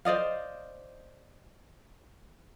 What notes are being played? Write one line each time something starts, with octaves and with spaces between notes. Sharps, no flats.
C5 D5 D#5 F5